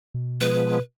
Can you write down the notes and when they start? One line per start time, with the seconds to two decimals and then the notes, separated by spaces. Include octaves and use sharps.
0.14 B2
0.41 F3 G#3 B3 B4